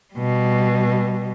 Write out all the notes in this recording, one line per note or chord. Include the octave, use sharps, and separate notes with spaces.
B2 G3